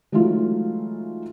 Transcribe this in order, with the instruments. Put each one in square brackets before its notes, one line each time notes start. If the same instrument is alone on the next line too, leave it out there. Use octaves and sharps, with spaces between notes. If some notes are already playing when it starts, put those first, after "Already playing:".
[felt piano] E3 F#3 G#3 A3 D#4 F4